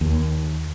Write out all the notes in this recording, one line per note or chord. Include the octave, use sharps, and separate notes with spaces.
D#2